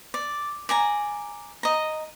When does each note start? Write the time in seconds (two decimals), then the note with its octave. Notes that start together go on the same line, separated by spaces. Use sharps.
0.14 D5
0.69 D5 G#5 A#5
1.63 D#5 A#5